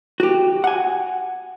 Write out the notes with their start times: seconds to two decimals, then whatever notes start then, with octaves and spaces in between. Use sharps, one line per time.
0.20 F#4 G4
0.64 F#5 G#5